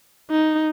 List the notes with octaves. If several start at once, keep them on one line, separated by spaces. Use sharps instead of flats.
D#4